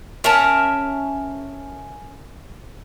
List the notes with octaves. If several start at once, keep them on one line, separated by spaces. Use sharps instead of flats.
C#4 A#4 E5 A5